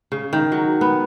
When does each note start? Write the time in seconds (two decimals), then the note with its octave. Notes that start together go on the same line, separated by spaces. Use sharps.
0.12 C#3
0.33 D#3
0.52 F#3
0.81 B3